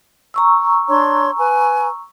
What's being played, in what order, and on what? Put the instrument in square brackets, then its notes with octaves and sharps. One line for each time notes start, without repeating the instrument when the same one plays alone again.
[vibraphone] A#5 C#6 E6
[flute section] D4 C#5 C6
B4 G#5